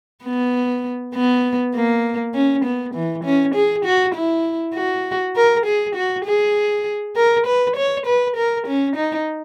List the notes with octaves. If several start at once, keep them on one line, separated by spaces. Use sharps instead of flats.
B3
B3
A#3
C#4
B3
E3
C#4
G#4
F#4
E4
F#4
A#4
G#4
F#4
G#4
A#4
B4
C#5
B4
A#4
C#4
D#4